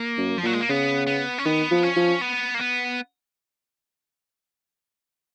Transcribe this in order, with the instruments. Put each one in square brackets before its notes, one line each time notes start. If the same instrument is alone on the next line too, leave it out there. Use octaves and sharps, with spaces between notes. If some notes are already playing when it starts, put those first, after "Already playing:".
Already playing: [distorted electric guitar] A#3
[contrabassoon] F#2
[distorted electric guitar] F3
[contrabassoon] A#2 [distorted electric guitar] F#3
[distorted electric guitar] G#3
A#3
[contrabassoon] C#3 [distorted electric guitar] B3
[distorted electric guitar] B3
C#4
[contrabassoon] D#3 [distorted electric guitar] B3
[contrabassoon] F3
[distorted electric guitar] C#4
[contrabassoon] F3
[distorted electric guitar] B3
A#3
B3